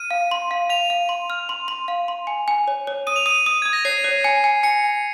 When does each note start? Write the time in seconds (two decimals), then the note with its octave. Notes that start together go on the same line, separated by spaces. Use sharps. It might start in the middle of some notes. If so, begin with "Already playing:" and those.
Already playing: F6 D#7
0.11 F5
0.31 C6
0.51 F5
0.70 F5 F7
0.90 F5
1.09 C6
1.30 F6
1.49 C6
1.68 C6
1.88 F5
2.08 C6
2.27 G#5
2.48 G#5
2.68 C#5
2.87 C#5
3.07 D#6 D#7
3.16 F7
3.26 D#6 D#7
3.46 D#6
3.62 D#6 G#6
3.73 A#6
3.85 C#5 C7
4.04 C#5
4.24 G#5
4.44 G#5
4.63 G#5 C#7
4.84 G#5